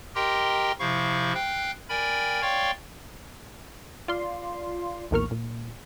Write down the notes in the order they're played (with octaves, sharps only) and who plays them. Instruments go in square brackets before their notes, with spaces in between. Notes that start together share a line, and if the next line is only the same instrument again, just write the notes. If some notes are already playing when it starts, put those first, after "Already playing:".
[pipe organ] G4 A#4 D#5 G5 A#5 C6
C3 F3 E4 F5 C#6
F5 G5 F#6
A#4 D5 G5 G#5 B5
C#5 D5 F5 G5 C6 C#6
[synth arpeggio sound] F4 D5 C6
B1 E2 A#2 A#4 C#6 F6
A#2